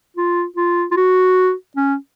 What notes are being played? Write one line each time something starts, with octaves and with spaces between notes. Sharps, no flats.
F4
F4
F4
F#4
C#4